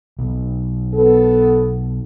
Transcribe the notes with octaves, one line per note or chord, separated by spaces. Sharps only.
B1
B3 A4